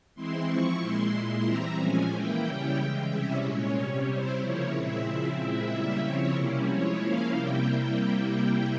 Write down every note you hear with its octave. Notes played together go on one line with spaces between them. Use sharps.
E3 G#3 C4 E4 C6
F3 C4 E4 C#6
A#2 G#3 E4 C6
A#2 G#3 E4
E3 G3 C4 E4 A#5
A#2 F3 G#3 C#4 G#5
E3 A#3 E4 G5
C#3 G3 C#4 E4
C#3 E3 G#3
C3 G3 C#4 E4 E5
A#2 G#3 C#4 C#5
C3 G3 C#4
C3 G3 C4 E4 C5
C#3 F3 A#3 E4 C#5
A#2 G#3 C4 E4 E5
C#3 F3 C4 E4 E5
A#2 G#3 C4 E4
C#3 G3 A#3 E4 E5
C#3 F3 C4 E4 C#5
C3 G3 A#3 C#4 E4
F3 G#3 E4 C#5
F3 A#3 C#4 E4 F5
C3 G3 A#3 E4 G5